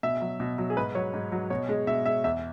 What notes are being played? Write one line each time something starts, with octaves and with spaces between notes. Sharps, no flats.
B2 E5
F#3
B2
F#3
G#4
G#2 B4
F#3 C#5
G#2
F#3
B2 C#5
G#3
B2 E5
G#3 E5
E2 E5